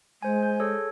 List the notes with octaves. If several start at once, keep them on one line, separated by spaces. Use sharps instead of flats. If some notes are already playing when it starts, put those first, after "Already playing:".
G#3 C5 G#5
G6
G#4 A4 C#5